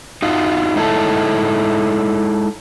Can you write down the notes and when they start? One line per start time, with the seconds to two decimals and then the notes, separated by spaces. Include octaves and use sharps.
0.22 D#4 F4 F#4
0.76 G#3 D#4 E4 A4